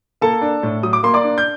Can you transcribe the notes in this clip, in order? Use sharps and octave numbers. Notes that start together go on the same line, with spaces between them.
A#3 A4 A5
D4
A2
F#3 D#6
D6
A#3 C6
D5 D6
D4
G6